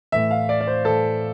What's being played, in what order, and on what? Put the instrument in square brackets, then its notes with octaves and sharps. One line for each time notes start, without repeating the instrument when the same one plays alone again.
[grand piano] A2 E3 E5
F5
D5
D5
C5
A2 E3 A4